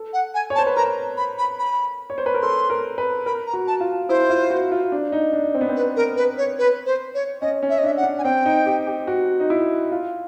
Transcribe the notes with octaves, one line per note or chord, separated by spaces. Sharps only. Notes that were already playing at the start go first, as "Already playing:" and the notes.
Already playing: A4
F#5
G#5
C#5
A5
C5
B4
A#4 A#5
B5
B5
B5
C#5
C5
B4
A#4
A4 C6
A#4
B4
A#4 B5
A#5
F#4
A5
F4
E4 C5
F4
F#4
F4
D4
D#4
D4
C4
B3
C4
B4
A#4
B4
C#5
B4
C5
C#5
C#4 D#5
C#4
E5
D#5
D4 E5
F#5
D4
G#5
C4 G5
D#4
G4
G4
F#4
D#4
E4
F4